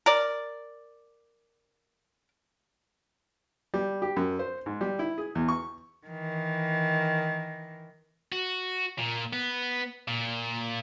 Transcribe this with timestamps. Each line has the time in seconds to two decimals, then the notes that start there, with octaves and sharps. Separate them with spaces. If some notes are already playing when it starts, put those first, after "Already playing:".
0.06 A#4 D5
3.74 G3
4.02 G4
4.16 F#2
4.39 C5
4.66 G#2
4.81 G3
4.99 E4
5.18 G#4
5.35 E2
5.48 C#6
6.07 D#3 E3
8.32 F#4
8.99 A#2
9.33 B3
10.08 A#2